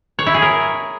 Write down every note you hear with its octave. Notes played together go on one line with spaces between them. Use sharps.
C#5
E4
G#4
A#4